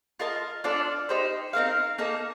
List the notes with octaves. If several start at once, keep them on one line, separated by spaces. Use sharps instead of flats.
F4 A#4 D#5 A5
D4 F4 A4 D5
D#4 G4 C5
C4 D#4 A#4 F5
A#3 D#4 A4